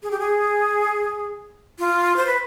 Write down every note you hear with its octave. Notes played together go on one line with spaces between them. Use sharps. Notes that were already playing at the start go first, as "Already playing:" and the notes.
G#4
G4
G#4
F4
C5
B4